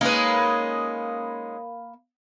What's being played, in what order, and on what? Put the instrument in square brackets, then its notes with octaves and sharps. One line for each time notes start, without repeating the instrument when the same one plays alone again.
[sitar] G#3 C#4 D#4 [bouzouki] A#3 B4